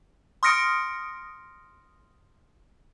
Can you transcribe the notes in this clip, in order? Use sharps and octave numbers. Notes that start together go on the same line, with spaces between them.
C6 D#6 F6 A#6 C#7 D7